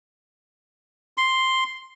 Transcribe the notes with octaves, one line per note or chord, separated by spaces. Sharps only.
C6